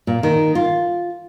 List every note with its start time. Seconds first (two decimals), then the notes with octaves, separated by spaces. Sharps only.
0.07 A#2
0.23 D#3
0.55 F4